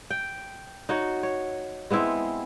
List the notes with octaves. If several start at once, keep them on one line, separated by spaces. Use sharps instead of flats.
G5
D#4 F#4 C#5 F#5
C#5
G#3 B3 C4 E4